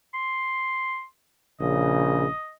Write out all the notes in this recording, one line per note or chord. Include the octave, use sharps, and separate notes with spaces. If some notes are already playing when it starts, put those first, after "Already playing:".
C6
A#1 C#3 D#5